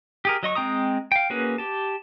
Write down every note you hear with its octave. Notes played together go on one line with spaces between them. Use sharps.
G4 G#4 A#4
F#3 D#5 C#6
G#3 C4 G5 A#5 D#6
F5 G5
A#3 C#4 F#4 G#4 B4
G4 A5